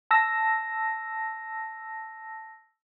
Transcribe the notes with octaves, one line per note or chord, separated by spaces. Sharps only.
A5 E6 A#6